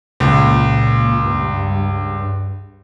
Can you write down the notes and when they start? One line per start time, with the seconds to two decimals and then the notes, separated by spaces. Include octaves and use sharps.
0.20 C#2 A#2
1.25 G2